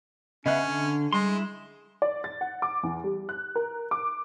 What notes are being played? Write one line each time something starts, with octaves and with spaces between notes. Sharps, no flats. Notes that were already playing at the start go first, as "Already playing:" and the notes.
C#3 B3 C#4 D#5 E5 F#6
D3
G3 G#3 C6
E4
D5
A6
F#5
D6
E2
G3
F#6
A#4
D6